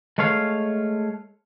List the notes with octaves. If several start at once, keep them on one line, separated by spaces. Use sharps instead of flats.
G#3 A3 C#5 F5